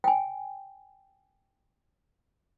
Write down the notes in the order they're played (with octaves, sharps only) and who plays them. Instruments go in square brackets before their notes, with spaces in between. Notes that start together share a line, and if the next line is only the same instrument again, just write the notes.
[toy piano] G5 G#5